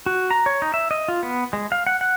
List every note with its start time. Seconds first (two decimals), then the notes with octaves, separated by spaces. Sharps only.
0.06 F#4
0.31 A#5
0.46 C#5
0.62 D#4
0.74 E5
0.91 D#5
1.08 F4
1.23 B3
1.53 G#3
1.72 F5
1.87 F#5
2.01 F#5